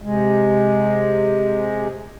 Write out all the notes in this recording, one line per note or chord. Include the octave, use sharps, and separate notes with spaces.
C3 G#3